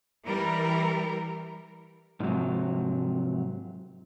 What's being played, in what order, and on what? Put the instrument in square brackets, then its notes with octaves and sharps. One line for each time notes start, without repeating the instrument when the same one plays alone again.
[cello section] E3 G3 A#4
[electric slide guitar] G#2 C3 F3 F#3